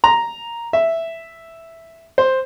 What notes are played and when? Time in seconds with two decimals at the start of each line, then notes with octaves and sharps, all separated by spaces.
0.04 A#5
0.73 E5
2.18 C5